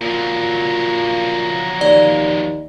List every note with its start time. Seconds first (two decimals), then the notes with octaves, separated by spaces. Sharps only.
0.01 A#2 F3 F#3 A#5
1.81 D#2 D5